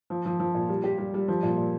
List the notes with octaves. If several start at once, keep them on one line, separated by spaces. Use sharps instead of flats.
F3
F3
F3
A#2
G3
G4
G3
G3
F3
A#2
A#2